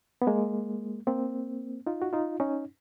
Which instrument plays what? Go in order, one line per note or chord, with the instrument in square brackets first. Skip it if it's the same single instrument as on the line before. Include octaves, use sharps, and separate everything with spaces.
[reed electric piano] B3
G#3 A#3
A#3 C4
D#4 F4
F#4
D#4 F4
C#4 D#4